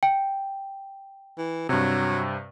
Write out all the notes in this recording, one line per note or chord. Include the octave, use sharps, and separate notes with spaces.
G5
E3
G2 C3 F#3